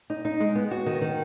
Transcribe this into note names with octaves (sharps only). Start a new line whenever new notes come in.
D#4
D#4
G#3
B3
F#4
D#3
D#3